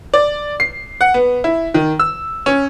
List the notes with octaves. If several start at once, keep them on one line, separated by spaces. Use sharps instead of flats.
D5
C7
F#5
B3
E4
D#3
E6
C#4